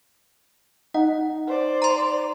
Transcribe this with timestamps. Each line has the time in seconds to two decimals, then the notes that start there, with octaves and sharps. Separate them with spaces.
0.94 D#4 F#5
1.47 C5 D5
1.82 A#5 C6